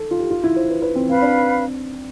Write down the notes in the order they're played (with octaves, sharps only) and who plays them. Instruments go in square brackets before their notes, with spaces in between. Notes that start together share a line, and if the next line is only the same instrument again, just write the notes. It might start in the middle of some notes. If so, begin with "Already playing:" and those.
Already playing: [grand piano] A4
F4
G4
F4
E4
C5
B4
B4
C4
[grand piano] C4 [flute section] B4 F5 B5
[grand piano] D4